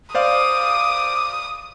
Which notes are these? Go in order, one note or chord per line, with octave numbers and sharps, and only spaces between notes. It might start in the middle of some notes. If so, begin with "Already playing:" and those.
C5 D5 F5 D6 D#6